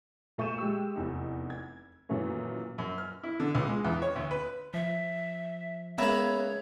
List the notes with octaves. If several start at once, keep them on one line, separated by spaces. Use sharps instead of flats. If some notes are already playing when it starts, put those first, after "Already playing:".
A#2 A3 C#6 G6 D#7 E7
G#3 G4 E6
F1 E2 D#4
G#6
F#2 A#2 D#3 E3 A3 C#4
F#2
F6
E4
D3
C#2
G#3
E2
C#5
D2
B4
F3 E5
C#2 A#3 B3 B4 C#5 E5 A#5 B5